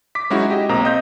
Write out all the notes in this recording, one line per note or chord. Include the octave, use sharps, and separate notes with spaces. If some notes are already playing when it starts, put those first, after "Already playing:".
D6 B6
F#3 G#3 C#4 D#4 E4 F#4
G4 D#5
B1 A#3 C4 A#5 D#6
D#5 G6